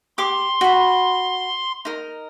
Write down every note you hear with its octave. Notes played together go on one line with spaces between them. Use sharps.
G4 C6 D6
F#4 B5
D#4 A#4